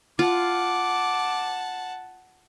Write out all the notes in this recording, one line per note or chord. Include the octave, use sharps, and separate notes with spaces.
F4 F#5 A5 D6